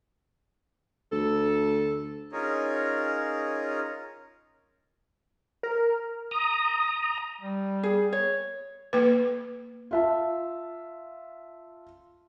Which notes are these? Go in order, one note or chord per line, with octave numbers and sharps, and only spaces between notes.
D2 A4
C#4 D#4 F4 G#4 A#4 C#5
A#4
A#5 D#6
G3
G#4
C#5
A#3 B4
F4 E5 A5